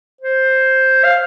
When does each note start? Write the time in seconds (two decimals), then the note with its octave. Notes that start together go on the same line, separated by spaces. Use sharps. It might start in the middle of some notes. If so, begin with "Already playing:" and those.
0.21 C5
1.04 F5